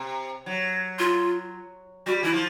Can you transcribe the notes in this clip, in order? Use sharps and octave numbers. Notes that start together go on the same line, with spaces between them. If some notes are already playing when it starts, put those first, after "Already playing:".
Already playing: C3
F#3
F4
G3 F#4
E3 E4
F3